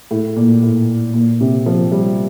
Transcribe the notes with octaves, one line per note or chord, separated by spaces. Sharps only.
A2
A#2
A2
A#2
C3
F3
G3